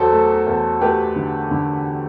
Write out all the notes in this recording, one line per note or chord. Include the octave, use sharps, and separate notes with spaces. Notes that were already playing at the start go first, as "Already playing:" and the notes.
Already playing: E2 F#3 A4 C5
A3
E2
A3 G4 B4
D3
D3